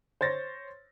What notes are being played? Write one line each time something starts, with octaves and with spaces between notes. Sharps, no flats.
C5 C#5 A6 A#6